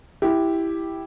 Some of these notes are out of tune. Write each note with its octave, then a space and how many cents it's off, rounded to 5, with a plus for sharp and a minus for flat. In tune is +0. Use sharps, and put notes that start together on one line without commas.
E4 +0 G4 +0